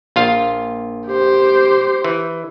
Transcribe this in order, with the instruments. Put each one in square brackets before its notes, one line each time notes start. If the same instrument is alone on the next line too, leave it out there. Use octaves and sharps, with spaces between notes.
[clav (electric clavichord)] A#1 F4 F5
[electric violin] G4 C5
[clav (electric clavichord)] E3